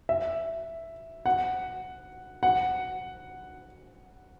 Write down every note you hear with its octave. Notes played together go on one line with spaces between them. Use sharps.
E5
F#5
F#5